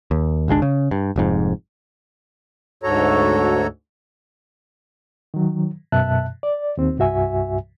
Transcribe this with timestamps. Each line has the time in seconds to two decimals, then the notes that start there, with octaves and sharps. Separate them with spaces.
0.11 D#2
0.48 G#1 C#2 G#3 D4
0.62 C#3
0.91 G2
1.16 F1 F2 G#2
2.83 D2 G#2 F#4 A4 C#5 A#5
5.34 D#3 F#3
5.92 F#2 B2 E5 A5 F#6
6.43 D5
6.77 D#2 C4
6.98 C2 G2 F#4 E5 G#5